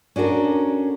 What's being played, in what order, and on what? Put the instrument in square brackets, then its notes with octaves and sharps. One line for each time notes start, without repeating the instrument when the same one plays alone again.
[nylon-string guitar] C#4 D4 F#4 A4 A#4